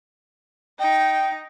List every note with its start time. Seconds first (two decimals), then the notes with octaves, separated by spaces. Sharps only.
0.80 D#4 G5